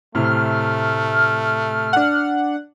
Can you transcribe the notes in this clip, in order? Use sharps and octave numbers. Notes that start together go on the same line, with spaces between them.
A2 C3 A3 F6
D4 F#5